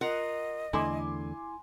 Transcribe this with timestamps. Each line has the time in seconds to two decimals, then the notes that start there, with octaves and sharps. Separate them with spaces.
0.01 F4 A#4 D#5 F#5
0.73 E2 D3 A3 E4 G#5 C6 D6